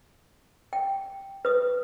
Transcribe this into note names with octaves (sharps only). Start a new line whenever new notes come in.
G5
B4 D#6